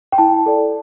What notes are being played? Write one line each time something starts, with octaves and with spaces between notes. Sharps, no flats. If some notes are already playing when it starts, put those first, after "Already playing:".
G5
E4 A5
A4 D5